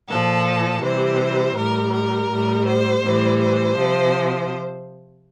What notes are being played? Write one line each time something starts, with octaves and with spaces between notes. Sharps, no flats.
A#2 F3 A4
C3 E3 G3 C5
A2 G3 A#4
A#4
A2 G3
C5
A2 E3 G3
C5
C3 F3